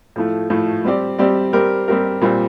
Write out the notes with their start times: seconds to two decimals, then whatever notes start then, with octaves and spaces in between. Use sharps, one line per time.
0.16 A2 F3 A3
0.50 A2 F3 A3
0.85 G3 C4 G4 D5
1.19 G3 C4 G4 D5
1.53 G3 C4 G4 A#4
1.88 G3 C4 G4 A#4
2.22 A#2 G3 C4